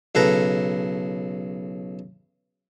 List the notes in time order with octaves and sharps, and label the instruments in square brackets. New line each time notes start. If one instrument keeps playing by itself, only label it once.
[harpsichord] B1 C#3 A4 B4 A#5